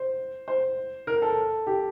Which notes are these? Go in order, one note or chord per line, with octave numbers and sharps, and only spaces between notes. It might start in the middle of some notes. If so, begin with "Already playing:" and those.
Already playing: C5
C5
A#4
A4
G4